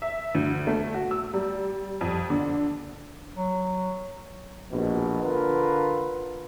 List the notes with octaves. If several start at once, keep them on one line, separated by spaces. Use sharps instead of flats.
E5
D2
A3
F#4
E6
G3
F2
D3
F#3
A#1 B2
D3 F4 A#4 B4